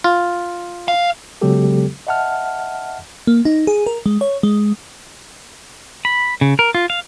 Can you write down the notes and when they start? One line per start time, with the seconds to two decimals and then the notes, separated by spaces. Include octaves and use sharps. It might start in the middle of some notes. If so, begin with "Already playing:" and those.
0.04 F4
0.88 F5
1.41 C#3 F#3 G#3 B3 G4 A4
2.07 D#5 E5 F#5 A5 F6
3.27 A#3
3.45 D#4
3.67 G#4
3.87 A#4
4.06 G#3
4.21 C#5
4.43 G#3
6.05 B5
6.41 C#3
6.59 A#4
6.75 F4
6.90 F5